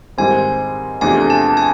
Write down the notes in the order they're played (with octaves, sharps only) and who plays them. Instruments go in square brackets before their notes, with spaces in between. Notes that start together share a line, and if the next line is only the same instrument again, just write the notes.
[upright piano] G#2 D#3 G3 C4 [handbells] G#5
[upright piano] E2 C3 F3 A3 D4 [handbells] G#5
[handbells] A5
G#5